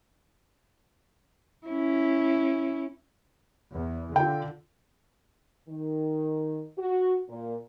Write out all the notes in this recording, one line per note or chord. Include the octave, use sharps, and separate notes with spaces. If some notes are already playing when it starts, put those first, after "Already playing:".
C#4 E4
E2
D3 F4 G5
D#3
F#4
A#2